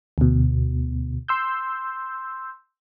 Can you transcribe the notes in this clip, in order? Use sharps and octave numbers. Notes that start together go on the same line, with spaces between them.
D2 B2
C6 E6 G6